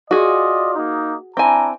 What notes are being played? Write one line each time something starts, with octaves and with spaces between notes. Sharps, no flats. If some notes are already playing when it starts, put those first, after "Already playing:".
F4 F#4 G#4 D5 D#5
A#3 D#4
C4 D4 E4 G#5 A#5